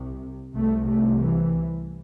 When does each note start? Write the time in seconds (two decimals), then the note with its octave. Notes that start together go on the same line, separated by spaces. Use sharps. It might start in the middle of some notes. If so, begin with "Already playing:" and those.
Already playing: C2 C3
0.55 C2 C3 A3
0.87 A3
1.19 E3